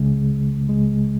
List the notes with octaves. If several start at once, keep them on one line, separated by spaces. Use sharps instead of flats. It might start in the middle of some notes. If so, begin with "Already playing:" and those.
Already playing: C#2 C#3 G#3
C#2 C#3 G#3